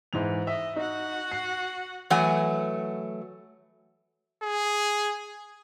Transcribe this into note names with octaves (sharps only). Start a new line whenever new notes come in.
G#2 E3 F7
D#5 E5
D#4 F#4 F#5
C7
E3 F#3 A3 F#5 G#5
G#4